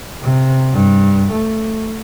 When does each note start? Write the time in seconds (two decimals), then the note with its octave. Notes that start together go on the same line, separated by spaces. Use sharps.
0.23 C3
0.73 G2
1.31 A3